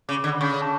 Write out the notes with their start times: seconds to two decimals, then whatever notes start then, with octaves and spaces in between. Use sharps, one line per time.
0.09 C#3 D6
0.24 D3
0.33 B5
0.41 C#3 C#6
0.51 B5
0.62 A5